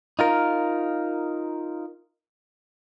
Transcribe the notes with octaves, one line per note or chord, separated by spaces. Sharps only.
D#4 F4 A#4